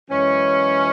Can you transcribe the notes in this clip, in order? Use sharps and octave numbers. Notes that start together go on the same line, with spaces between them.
F#2 E3 G#3 C#4